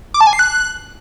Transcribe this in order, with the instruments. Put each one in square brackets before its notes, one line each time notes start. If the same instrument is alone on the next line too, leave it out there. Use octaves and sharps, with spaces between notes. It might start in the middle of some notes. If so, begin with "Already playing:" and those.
[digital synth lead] D6
A5
G#5
C7
F#6